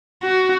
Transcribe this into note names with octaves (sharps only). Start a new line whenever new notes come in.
F#4